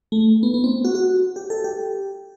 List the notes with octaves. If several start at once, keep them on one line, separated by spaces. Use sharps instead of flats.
A3
B3
B3
C4
F#4
F#4
G4
A4
G4